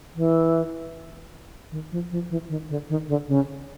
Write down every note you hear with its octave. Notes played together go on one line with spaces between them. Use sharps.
E3
D#3
F3
F3
E3
D#3
D3
D#3
D3
C#3